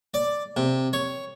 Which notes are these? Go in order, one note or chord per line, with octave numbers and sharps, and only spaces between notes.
D5
C3
C#5